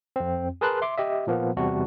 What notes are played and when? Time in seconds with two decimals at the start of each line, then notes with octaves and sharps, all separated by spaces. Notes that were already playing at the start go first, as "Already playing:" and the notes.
0.16 F2 C4
0.61 G#4 A#4 B4 A5 C6 F#6
0.82 E5 C6 D6
0.97 G4 D#5 E5
1.27 A#2 F3 A#3 B3
1.57 E2 C3 G3 C4 F#4 A5